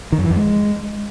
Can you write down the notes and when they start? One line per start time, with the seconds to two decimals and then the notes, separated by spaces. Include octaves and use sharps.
0.12 D#3
0.18 F#2
0.24 E3
0.30 F2
0.36 G#3